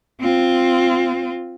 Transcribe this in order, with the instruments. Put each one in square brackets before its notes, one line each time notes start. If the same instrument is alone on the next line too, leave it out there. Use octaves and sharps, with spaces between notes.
[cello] C4 F4